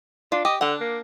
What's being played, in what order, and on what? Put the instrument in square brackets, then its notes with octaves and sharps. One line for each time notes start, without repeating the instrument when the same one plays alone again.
[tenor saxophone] D4 [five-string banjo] F4
[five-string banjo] G4 [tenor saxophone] D#5
[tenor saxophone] D3 [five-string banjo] D4 F#5
[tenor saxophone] A#3